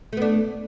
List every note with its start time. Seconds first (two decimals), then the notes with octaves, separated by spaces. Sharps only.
0.13 A3
0.17 B3
0.22 D4